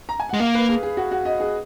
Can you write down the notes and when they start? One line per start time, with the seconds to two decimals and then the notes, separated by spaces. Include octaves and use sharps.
0.09 A#5
0.20 G#5
0.29 G#3 F#5
0.40 A#3 F5
0.55 B4
0.69 G#4
0.83 G#4
0.97 F#4
1.11 F#4
1.25 D#5
1.40 G#4